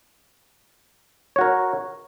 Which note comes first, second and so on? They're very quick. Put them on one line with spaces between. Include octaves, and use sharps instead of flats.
C#5 F#4 A#4